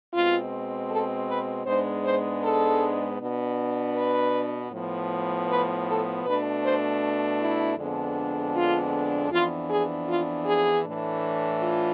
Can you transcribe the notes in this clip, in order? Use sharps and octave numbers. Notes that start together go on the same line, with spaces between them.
B2 G#3 C4 F4
A4
B4
G#2 G#3 B3 D4 C5
C5
A4
B2 B3 D4
B4
A2 F3 B3
B4
A4
B2 A3 D4 B4
C5
E4
F2 D3 G#3 B3 D4
F4
F2 E3 B3 D4 F4
G#4
F4
G#4
A2 E3 A3 D4
F4